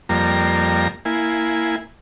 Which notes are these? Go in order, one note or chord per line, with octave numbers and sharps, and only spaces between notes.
F2 G3 A#3 A#5
A#3 E4 G#5